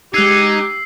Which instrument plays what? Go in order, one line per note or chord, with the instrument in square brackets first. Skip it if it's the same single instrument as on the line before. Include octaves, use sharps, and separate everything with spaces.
[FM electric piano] G#3 F#6 G#6 [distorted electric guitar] D#4 [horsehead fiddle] G4 [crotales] E6 C7